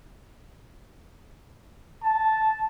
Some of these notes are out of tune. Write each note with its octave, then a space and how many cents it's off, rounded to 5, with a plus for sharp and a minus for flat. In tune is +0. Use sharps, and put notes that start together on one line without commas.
A5 -5